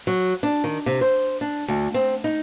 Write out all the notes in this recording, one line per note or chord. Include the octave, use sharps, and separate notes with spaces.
F#3
D4
D#3
C3
C5
D4
D2
C4
D#4